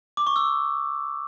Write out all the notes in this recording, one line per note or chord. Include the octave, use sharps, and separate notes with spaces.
D6
C#6
E6